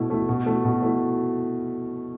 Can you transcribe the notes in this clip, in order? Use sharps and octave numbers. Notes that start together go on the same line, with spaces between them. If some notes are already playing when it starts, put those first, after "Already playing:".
Already playing: B2 A3 E4
A3 E4
B2
A3 E4
B2
A3 E4